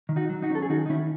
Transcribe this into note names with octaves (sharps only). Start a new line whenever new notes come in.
D#3
D#4 F#4
F#3
D#4 F#4
C#4
A4
G#4
D#3 D#4 F#4
D#4
D#3 C#4 E4